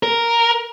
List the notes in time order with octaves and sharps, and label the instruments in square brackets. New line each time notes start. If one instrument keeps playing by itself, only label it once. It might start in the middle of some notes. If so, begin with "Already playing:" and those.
[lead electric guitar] A#4